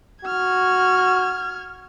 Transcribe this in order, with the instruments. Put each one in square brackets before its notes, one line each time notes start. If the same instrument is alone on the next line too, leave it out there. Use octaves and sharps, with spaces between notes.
[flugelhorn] F#4 [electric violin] F6 G#6